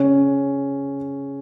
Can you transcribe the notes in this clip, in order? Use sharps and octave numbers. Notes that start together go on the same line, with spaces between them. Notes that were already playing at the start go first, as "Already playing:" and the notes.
Already playing: C#3 C#4